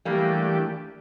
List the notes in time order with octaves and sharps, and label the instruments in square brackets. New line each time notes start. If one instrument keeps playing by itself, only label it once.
[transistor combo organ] E3 A3 D4 G4 [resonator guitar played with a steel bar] G3 A#3